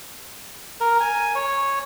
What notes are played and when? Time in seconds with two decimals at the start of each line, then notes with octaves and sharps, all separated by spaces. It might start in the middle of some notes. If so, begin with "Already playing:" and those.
0.81 A#4
1.00 G#5
1.35 C#5